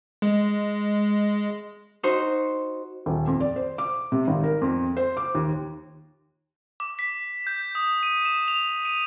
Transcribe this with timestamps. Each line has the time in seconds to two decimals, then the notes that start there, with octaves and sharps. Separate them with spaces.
0.22 G#3
2.03 D#4 F#4 C5
3.06 D#1
3.27 F2
3.40 D5
3.56 C5
3.78 D6
4.12 C3
4.27 G#1
4.43 A#4
4.62 F2
4.97 C5
5.17 D6
5.35 D#2
6.80 D6
6.99 B6
7.47 G6
7.75 D#6
8.03 D#7
8.25 E7
8.48 F7
8.85 D#7